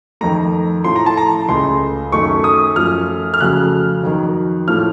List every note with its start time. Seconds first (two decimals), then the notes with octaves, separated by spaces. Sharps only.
0.21 F2 D#3 A3 A#5
0.84 A2 F3 A3 C6
0.96 A#5
1.06 A5
1.17 A#5
1.48 C#2 C#3 A3 C6
2.12 F#2 D#3 A3 C#6
2.44 D#6
2.76 F#2 F3 A3 F6
3.34 F6
3.40 F2 C#3 F#3 A3 F#6
4.04 F2 D#3 F#3
4.68 A2 F3 A3 F6